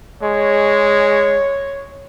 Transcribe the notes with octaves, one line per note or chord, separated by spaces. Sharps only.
G#3 C#5